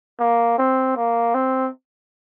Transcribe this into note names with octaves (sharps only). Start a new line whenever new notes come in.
A#3
C4
A#3
C4